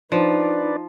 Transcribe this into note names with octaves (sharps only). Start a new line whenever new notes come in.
F3 D4 D#4 B4 D5